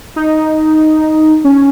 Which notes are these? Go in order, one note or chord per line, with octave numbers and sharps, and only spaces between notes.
D#4
C#4